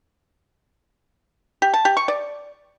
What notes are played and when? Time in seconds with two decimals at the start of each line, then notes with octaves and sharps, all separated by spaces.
1.62 G4
1.74 A5
1.85 G4
1.97 C#6
2.08 D5